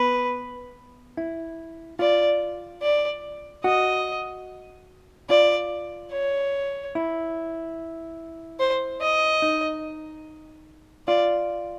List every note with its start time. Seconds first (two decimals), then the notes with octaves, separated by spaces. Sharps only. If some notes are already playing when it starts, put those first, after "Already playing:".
Already playing: B3 B4
1.17 E4
1.99 F4 D5
2.82 D5
3.64 F#4 D#5
5.29 F4 D5
6.12 C#5
6.95 E4
8.60 C5
9.01 D#5
9.42 D#4
11.08 F4 D5